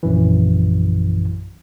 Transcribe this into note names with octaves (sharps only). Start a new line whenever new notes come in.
A#1 F#2 E3